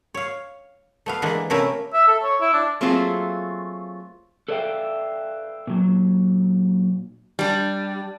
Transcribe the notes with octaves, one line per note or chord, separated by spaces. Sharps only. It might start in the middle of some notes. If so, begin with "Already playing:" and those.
C#5 F5
A3 B3 F5
D3 E3 G#3 A#3 D4
C3 A3 A#3 C#4 E4 A#4
E5
A4
C#5
E4
D4
F#3 A3 A#3 C4 F4 G#4
A4 B4 D5 E5 F5 G5
A#2 F#3
G3 D4